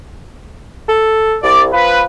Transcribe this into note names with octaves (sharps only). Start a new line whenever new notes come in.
A4
C2 D5
F3 B4